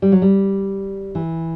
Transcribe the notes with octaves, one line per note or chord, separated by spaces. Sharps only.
G3
F#3
G3
E3